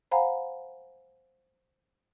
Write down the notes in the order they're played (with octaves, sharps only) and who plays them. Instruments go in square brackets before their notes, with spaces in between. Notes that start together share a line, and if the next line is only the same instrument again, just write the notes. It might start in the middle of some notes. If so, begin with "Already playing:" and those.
[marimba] C5 F5 F#5 G#5 A#5 B5